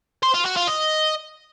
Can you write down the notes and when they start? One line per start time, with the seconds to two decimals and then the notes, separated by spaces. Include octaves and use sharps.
0.23 C5
0.34 F4
0.45 F#4
0.56 F4
0.67 D#5